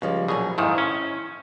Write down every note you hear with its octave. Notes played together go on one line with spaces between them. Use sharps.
C#2 C#3 F3 G3
A#1 B2 F#3 G#4
F2 G#2 D#3 E4
C#4